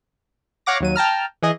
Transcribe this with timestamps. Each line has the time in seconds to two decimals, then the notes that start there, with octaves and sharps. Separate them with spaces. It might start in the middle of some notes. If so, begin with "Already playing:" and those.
0.66 C#5 F5 F#5 D6 A#6
0.80 D#2 F#3 D#7
0.96 G5 A5 A#5 F6
1.42 E3 G#4 D#5